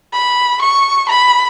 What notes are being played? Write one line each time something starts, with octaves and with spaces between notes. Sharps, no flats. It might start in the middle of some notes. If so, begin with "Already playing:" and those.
B5
C#6
B5